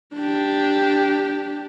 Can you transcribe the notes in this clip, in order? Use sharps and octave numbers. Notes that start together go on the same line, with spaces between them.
D4 G4